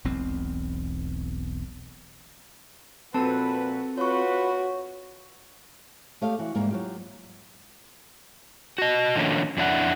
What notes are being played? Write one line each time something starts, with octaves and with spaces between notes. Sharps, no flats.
E1 B1 E2 C4
A#2 F3 C4 F#4 A4 B4 A5
F4 F#4 B4 C#5 C#6
A3 G4 C#5 D#5 F5
E3 F#4
E2 G#2 G3 A#3
F#3 F4 G4
F#4 D#5
D#3 F3 A3 A#3 C#4 D4
F2 D4 E4 F#5